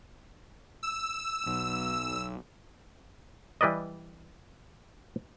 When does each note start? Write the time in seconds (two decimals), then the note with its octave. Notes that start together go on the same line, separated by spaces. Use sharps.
0.83 E6
1.46 B1
3.61 E3 G3 B4 D5 D#5